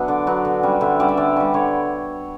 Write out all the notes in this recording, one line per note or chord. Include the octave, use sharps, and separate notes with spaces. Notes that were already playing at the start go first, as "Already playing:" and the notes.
Already playing: F#3 B3 D4 E5
D3 D5
F#3 B3 D4
D3
G3 C#4
D3 E5
G3 C#4 D5
E5
D3 D5
G3 C#4
D3 C#5